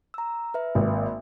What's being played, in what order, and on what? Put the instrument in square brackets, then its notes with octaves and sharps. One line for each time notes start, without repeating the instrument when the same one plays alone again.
[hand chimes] A#5 E6
B4 E5
[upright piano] G#1 [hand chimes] A#3 E5